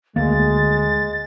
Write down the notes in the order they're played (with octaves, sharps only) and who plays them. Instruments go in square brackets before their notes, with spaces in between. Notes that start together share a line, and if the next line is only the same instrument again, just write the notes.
[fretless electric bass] D2 A#3 [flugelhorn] G#3 [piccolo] A6